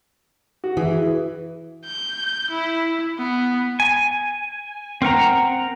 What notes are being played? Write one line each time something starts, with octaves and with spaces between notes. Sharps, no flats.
F#4
E3 G#4
G6
E4
B3
G#5
C4 A#4 F#5 A#5